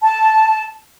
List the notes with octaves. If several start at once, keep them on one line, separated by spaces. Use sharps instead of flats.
A5